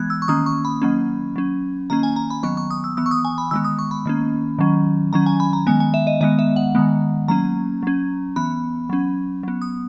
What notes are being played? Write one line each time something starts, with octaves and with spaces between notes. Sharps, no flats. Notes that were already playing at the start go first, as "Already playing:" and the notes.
Already playing: E3 G#3 B3 F#6 G#6
E6
C#6
D#3 A#3 C#4 D#6
C#6
B5
D#3 F#3 A#3 C#4
F#3 C#4
D#3 A#3 C#4 A#5
G#5
A#5
B5
D#3 F#3 B3 C#6
C#6
D#6
E6
E3 B3 E6
C#6
D#6
G#5
B5
D#3 G#3 B3 E6
D#6
C#6
B5
D#3 A#3 C#4
D#3 F#3 C#4
D#3 F#3 C#4 A#5
G#5
B5
A#5
D#3 G#3 B3 G#5
G#5
E5
D#5
D#3 G#3 B3 D#5
E5
F#5
D#3 G#3 B3
F#3 A#3 C#4 A#5
F#3 C#4
E3 B3 B5
F#3 C#4
F#3 B3
D#6